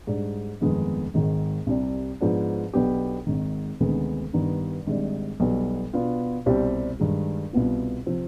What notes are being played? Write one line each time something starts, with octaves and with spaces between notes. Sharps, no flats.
G#2 G3 D4
G1 F2 D#3 G#3 B3
G#1 G#2 D#3 G#3
C2 C3 G3
G#2 F3 B3 D4
B1 B2 B3 D4 G4
G#1 G#2 D#3
D2 C3 D#3 G#3 B3
G2 D#3 G3 B3 D#4
G#1 G#2 G3 D4
B1 B2 G3 B3
B2 B3 D4 F4
C2 B2 G3 C4 G4
G2 D#3 G#3
C2 B2 B3 F4
C3 F3 C4